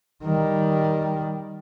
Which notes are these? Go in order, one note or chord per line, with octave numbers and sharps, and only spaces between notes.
D#3 G3